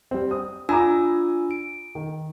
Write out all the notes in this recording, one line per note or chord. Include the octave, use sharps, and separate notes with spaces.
G3 C4
D#6
D4 F4 G#5 A#5 D6 E6
D7
D#3